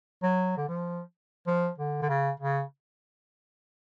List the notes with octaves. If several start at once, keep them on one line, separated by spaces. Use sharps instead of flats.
F#3
D3
F3
F3
D3
D3
C#3
C#3